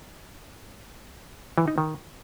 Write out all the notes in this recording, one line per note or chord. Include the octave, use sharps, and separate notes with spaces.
E3
D#4
D#3